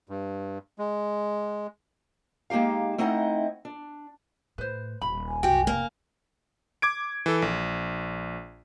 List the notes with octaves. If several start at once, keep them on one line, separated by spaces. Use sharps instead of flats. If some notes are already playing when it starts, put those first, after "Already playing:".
G2
G#3
G#3 A#3 D#4 G4 F5
A3 C4 D#4 E4 D#5 F#5
D4
A2 B4 C5
D#1 B5
G#5
C2 F#2 F#4 G4 G5
F1 A#3 C#4
D6 G#6 D7
E3 A4
A#1